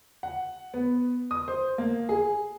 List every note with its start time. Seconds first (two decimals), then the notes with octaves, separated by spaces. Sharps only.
0.23 F#5
0.74 B3
1.31 D#6
1.48 C5
1.78 A#3
2.09 G#4